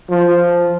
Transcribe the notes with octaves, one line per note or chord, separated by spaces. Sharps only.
F3